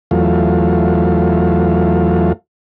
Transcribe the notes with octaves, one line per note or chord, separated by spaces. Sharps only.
E2 F#3 A3 F4